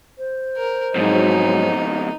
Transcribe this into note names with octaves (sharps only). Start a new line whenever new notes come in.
C5
A#4
F2 G#2 B2 F#3 D#4